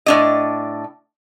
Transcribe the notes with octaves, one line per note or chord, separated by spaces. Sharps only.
A2 D4 D#5